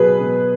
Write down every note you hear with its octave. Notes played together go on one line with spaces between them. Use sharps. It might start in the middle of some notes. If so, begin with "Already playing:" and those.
Already playing: B2 F#3 B3 G#4 B4
B2